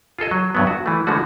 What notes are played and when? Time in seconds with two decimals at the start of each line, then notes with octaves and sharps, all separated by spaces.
0.19 F4 G#4 A4 D#5
0.31 F#3
0.55 G2 F#3 B3
0.67 F#4
0.86 E3 A3
1.07 D3 E3 F3 G#3 A3 F#4